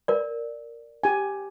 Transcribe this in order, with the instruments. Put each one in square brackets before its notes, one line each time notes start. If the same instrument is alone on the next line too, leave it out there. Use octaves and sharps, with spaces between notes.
[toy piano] A#4 D5
[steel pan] G4 G#5